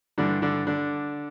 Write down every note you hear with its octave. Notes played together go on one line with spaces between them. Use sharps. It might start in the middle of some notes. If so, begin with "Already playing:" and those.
G2 D3 E3 G3 D4
D3 D4
D3 D4